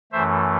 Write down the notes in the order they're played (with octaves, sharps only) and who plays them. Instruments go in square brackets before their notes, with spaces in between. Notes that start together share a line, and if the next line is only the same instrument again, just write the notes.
[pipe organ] F#2 E3 A3 C5 E5